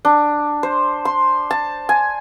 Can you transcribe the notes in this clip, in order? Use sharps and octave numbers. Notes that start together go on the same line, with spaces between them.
D4
C5
C6
A5
G#5